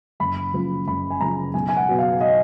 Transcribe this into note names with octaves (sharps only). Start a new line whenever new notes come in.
F#1 B5
F#2 C#3 F3
F#1 B5
G#5
F#2 C#3 F3 A#5
B1 G#5
G#5
F#5
B2 F#3 B3
F5
D#5